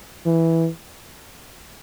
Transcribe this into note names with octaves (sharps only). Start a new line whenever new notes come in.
E3